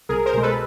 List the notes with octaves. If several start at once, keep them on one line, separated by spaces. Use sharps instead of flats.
C2 G#4 A#4
A#4 C5
B2 G#3
A4 B4